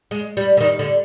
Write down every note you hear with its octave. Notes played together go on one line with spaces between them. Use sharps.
G#3
G3
D3
D#3
D3